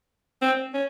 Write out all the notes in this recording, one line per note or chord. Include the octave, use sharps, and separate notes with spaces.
C4
C#4